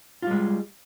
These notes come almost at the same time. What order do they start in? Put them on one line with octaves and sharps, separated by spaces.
F4 G3 G#3